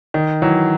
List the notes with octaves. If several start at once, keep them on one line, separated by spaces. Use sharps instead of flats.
D#3
E3 F#3